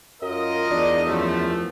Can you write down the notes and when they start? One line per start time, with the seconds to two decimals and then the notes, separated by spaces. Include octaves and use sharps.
0.22 F#2 F4 A#4 D#5
0.71 E2 D4
1.05 F#2 F3 A3